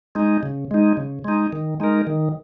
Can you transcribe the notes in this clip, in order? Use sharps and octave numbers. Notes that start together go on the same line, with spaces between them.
G#3 D#4
C#3
G#3 D#4
C#3
G#3 D#4
D#3
G#3 D#4 A#4
D#3